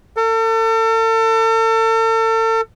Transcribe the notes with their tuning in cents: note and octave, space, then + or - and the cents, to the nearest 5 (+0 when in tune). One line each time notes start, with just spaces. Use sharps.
A4 +40